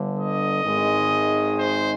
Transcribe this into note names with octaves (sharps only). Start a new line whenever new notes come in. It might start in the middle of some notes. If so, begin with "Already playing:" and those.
Already playing: G1 G2 D3
D#5
G#1 G#2 D#3 G#3
C5